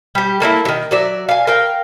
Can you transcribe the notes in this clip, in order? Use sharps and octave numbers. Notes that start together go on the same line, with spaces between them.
G3 G4
A3 A#3 C#4 E4
D#3 F#3
F#3 D5 E5
F5 G#5
A#4 F5 G5